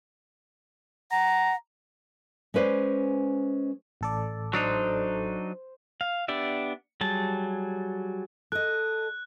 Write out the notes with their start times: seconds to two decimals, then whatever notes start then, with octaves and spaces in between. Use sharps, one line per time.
1.11 F#5 A#5
2.54 G#3 C#4 B4 C5 D5
4.01 A1 A4 D5
4.53 F#3 D4 D#4 C5
6.01 F5
6.28 B3 D4 G4 D5 E5
7.01 F#3 G3 G#4 A5
8.52 A4 D#5 F#6